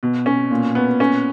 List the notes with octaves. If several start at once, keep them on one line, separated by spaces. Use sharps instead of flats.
B2
C#4
A#2
B3
C#4